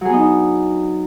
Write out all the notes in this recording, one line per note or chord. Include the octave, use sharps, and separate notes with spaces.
F#3 B3 D4 D#4 G#4